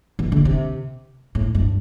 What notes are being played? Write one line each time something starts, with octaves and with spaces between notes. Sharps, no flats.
E3
D3
C3
A2
G2